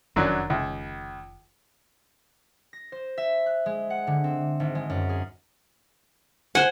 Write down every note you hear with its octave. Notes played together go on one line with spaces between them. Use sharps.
F1 F#2 D#3 F#3 D4
C#2
A#6
C5
E5
F#6
G#3
F#5
D3
C4
G#1
G#3
F#2
G#4
C5 F#5 G#5